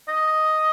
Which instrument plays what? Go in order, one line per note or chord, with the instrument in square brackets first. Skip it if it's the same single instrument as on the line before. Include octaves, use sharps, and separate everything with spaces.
[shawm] D#5